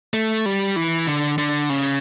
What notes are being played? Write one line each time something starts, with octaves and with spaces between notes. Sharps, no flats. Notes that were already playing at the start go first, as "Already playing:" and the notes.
A3
G3
E3
D3
D3
C#3